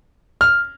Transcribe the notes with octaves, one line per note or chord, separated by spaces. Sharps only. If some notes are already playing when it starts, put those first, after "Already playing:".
F6